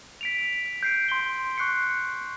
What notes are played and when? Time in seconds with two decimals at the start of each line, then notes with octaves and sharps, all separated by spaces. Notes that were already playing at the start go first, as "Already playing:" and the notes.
0.21 B6 D7 F7
0.83 G6 C7 D7
1.09 C6 G7
1.58 C#6 F#6 C7 C#7